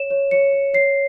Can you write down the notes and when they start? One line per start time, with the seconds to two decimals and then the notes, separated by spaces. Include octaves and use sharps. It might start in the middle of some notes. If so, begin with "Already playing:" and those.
Already playing: C#5 E7
0.11 C#5
0.31 C#5 C#7
0.53 C#5
0.74 C#5 C7